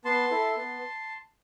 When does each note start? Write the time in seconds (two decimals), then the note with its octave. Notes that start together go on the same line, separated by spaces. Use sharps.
0.05 B3 A5 C6
0.31 E4 A4
0.57 B3